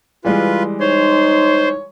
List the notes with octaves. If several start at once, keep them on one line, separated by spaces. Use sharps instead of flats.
E3 G3 G#3 F4 B4
D#4 C5 C#5 C6